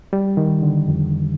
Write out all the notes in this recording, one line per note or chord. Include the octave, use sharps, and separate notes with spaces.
G3
D#3
D3
F2